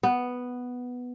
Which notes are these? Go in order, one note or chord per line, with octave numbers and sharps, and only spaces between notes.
B3